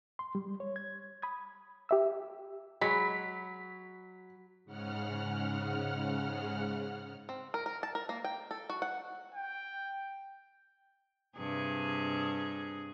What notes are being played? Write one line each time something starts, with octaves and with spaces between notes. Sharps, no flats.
C6
G3
C#5
G#6
B5 D#6 G#6
G4 E5 E6
F#3 G#3 B5 B6
G#2 C#3 F#5 F6
C4
A#4
A#4
A5
A#4
A#3
G5
A4
F#4
F#5
G5
G2 C3 G#4